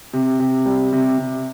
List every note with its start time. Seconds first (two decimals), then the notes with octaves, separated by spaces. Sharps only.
0.13 C3
0.39 C3
0.66 G3
0.93 C3
1.18 C3